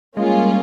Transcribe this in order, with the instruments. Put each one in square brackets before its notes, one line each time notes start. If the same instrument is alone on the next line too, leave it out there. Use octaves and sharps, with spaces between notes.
[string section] G3 A#3 C#4 F4 G#4 [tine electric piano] G#3